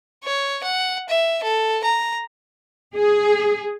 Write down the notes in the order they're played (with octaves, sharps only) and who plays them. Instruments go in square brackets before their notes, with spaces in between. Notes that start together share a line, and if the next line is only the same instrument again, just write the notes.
[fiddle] C#5
F#5
E5
A4
A#5
[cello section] G#4